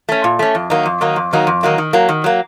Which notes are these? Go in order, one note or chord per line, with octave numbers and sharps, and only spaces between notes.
A3 C#4
A#2
A3 C#4
F2
D#3 F#3 A#3 D#4
F2
D#3 F#3 A#3 D#4
F2
D#3 F#3 A#3 D#4
F2
D#3 F#3 A#3 D#4
D#3
F#3 A#3
D#3
F#3 A#3